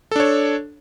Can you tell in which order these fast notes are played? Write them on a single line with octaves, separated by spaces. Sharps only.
A4 D4 C#5